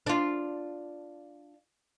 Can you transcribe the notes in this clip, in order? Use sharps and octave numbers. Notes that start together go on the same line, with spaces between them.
D4 F4